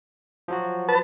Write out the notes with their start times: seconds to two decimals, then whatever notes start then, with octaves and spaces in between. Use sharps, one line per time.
0.48 F3 F#3 F#4
0.88 B4 A5